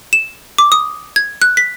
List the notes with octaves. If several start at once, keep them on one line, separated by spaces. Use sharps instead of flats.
E7
D6
D#6
G#6
F#6
B6